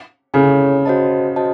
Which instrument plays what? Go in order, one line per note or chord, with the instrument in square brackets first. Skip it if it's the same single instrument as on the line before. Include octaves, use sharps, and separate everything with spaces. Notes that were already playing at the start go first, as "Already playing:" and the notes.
[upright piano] C#3 [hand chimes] E4 A4 C#5 G#5
[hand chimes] F#4 C5 D#5 A5
F#4 C5 D#5 A5